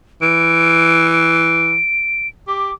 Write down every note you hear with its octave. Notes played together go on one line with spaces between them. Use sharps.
E3 D7
D7
G4 D6